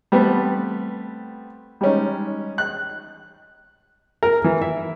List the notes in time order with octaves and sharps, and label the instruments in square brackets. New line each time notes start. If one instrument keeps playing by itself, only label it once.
[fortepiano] G3 A3 B3 C4 B4
G3 G#3 C#4 D#4
F#6
A#4
E3
E5